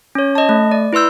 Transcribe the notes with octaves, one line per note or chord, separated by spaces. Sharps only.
C#4 C#5
D#5 A5
A3
D5
E4 B4 C6 E6 G6